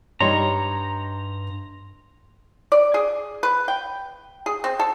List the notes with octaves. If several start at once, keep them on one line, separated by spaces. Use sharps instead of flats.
G2 G3 D#4 C#5 A#5 C6
D5
G#4
B4
G5
G#4
C4
A4